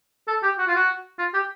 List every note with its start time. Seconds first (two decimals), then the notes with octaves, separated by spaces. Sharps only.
0.28 A4
0.43 G4
0.58 F#4
0.67 F4
0.76 F#4
1.19 F4
1.34 G4